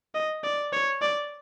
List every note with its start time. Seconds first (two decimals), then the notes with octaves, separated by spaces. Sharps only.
0.15 D#5
0.44 D5
0.73 C#5
1.02 D5